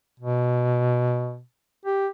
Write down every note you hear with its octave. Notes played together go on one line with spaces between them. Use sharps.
B2
G4